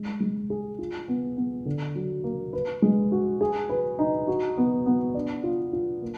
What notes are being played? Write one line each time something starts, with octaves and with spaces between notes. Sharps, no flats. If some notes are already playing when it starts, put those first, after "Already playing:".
Already playing: G#3
G#3
G#4
F4
B3
B3
D3
F#3
A#3
B4
G#3
F#4
G#4
B4
D#4
F#4
B3
B3
D4
F4
F4
A#3